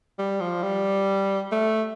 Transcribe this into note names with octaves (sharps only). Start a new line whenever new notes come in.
G3
F3
G3
A3